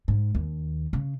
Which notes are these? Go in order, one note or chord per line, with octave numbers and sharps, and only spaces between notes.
G#2
D#2
C#3